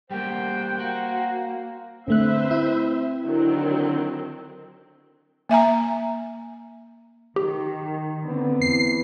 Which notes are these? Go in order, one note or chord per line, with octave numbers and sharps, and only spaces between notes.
G3 A3 A#3 C5 F#5 G5
A#3 F#4
D3 A3 C4 B4 C5 E5 F#6
E4
D3 D#3 F#3 C4
A#3 E5 G#5 A#5
D#3 G4
D3 B3 C4
E2 C7